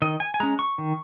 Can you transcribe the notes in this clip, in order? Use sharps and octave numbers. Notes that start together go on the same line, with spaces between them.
D#3 D#5
G#5
G#5
G#3 C#4 A#5
C#6
D#3